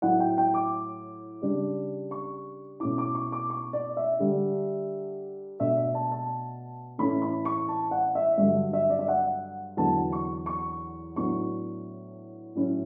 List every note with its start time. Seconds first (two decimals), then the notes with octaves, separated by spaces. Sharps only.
0.02 A2 F#3 A3 E4 F#5
0.20 G5
0.38 G5
0.54 D6
1.42 C#3 G3 D4
2.11 C#6
2.80 B2 A3 C#4 E4 D6
2.98 D6
3.15 C#6
3.32 D6
3.50 C#6
3.73 D5
3.97 E5
4.19 D3 G3 D4
5.59 B2 A3 D4 E5
5.77 E5
5.95 A5
6.12 A5
6.98 A2 E3 A3 C#4 E4 B5
7.22 B5
7.45 C#6
7.68 A5
7.91 F#5
8.15 E5
8.38 G2 D3 F#3 E5
8.73 E5
8.90 D5
8.99 E5
9.08 F#5
9.77 E2 D3 F#3 B3 A5
10.12 C#6
10.46 C#6
11.16 A2 F#3 B3 D4 C#6
12.55 A2 F#3 C#4 E4